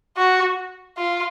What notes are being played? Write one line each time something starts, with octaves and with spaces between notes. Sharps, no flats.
F#4
F4